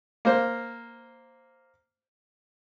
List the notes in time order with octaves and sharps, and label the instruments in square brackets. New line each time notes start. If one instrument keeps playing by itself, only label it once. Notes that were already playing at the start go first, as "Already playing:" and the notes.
[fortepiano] A#3 C5